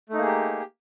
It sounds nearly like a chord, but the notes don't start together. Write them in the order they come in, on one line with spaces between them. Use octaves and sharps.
A3 D#4 A#3 G#4 G4